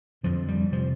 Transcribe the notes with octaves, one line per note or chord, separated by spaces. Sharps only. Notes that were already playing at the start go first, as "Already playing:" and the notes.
F2 D3 F3
G3
C3 F3